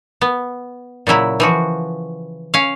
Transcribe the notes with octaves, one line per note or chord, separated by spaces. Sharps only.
B3
A#2 C#3 F#3 E4
E3 F3 F#4
C#4 F5